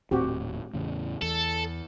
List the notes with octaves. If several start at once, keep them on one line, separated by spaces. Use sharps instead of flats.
D#1 A2 C4 F#4 G4
E2 A2 C#3
E2 A4